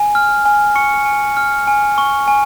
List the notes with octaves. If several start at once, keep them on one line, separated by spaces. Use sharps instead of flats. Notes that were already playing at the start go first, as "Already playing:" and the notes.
Already playing: G#5
F6
G#5
C#6 C#7
G#5
F6
G#5
C#6
G#5